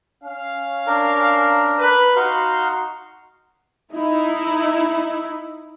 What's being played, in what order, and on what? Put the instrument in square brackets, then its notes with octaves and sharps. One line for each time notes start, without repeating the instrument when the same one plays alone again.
[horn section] C#4 F5
[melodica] D4 A#4
[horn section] B4
[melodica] D#4 F5 C6 [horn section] F#4
[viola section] D#4 E4